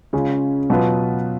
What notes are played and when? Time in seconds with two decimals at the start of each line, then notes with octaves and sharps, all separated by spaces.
0.13 C#3 G#3 C#4 F4
0.70 B2 F#3 B3 F4 B4